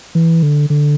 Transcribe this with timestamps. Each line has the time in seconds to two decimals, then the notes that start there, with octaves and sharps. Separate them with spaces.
0.15 E3
0.43 D3
0.70 D3